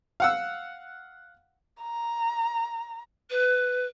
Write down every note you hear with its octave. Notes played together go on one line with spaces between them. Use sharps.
F5 F#5 E6
A#5
B4